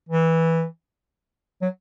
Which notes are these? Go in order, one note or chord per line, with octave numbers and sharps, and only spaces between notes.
E3
F#3